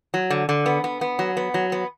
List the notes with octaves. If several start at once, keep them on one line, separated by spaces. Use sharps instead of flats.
F#3
D3
D3
B3
B3
B3
F#3
B3
F#3
B3